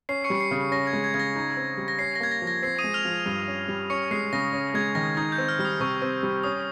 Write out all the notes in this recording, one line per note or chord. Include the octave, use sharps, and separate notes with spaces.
C#4 C7
C#6 C#7
G3
C#7
C7
C#3
C#4 A#6
G#6
G#3
G#6
C#3 G#6
A#6
D#4
C4
G3
A#6
C#4 C7
A#6
A#3 G#6
A#6
F3
A#6
C4 C7
D#6 D#7
G#3
F6 F7
F3
G2
C#4
G3
C#4 C#6 C#7
G#3 C7
C#3 A#6
C#4
G#3 G#6
D#3 A#6
D#4 G#6
G6
C4
F6
G3 F6
D#6
C3 C#6
C4
G3
C#4 D#6